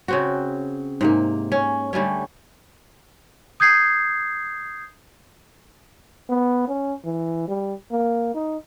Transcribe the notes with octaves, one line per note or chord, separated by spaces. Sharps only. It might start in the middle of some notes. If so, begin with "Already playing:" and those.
C#3 C4 F#4
G#2 C3 A#3
C#4
D3 G3 A3 C#4
D#6 G6 G#6 C7
B3
C#4
E3
G3
A#3
D#4